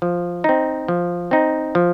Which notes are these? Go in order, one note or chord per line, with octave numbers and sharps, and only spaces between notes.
F3
C4 D#4
F3
C4 D#4
F3